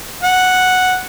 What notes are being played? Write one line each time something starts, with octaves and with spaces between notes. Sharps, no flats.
F#5